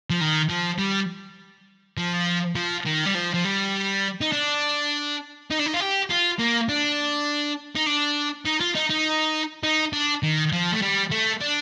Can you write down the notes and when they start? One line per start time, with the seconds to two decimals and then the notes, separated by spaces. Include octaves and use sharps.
0.10 F3
0.21 D#3
0.50 F3
0.79 G3
1.97 F3
2.56 F3
2.86 D#3
3.06 G3
3.15 F3
3.34 F3
3.45 G3
4.21 D#4
4.33 D4
5.51 D#4
5.59 D4
5.66 D#4
5.74 F4
5.80 G4
6.10 F4
6.39 A#3
6.69 D4
7.75 D#4
7.86 D4
8.45 D#4
8.60 F4
8.75 D#4
8.90 D#4
9.64 D#4
9.93 D4
10.23 D#3
10.53 F3
10.73 A3
10.82 G3
11.11 A3
11.41 D4